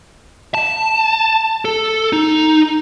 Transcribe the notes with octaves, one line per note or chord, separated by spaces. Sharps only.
A5
A4
D#4